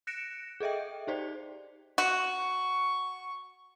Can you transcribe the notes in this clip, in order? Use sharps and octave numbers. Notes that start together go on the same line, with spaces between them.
F#6 A#6 C#7 D7 E7
G#4 A4 D#5 E5 G5
D#4 G4 C5 D5
F#4 C#6